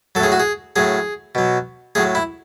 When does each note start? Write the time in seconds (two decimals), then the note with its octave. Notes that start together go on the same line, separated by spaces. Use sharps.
0.15 F#3 A4
0.20 A2 G#4
0.32 F#4
0.40 G#4
0.76 A2 F#3 G#4
1.35 B2 F#3
1.95 A2 F#3 G#4
2.15 E4